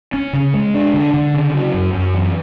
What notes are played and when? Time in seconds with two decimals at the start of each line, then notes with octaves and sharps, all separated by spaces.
0.13 C#4
0.33 C#3
0.54 G#3
0.74 D4
0.94 D3
1.14 D3
1.34 C#3
1.54 F#3
1.74 F#2
1.93 F#2
2.14 E3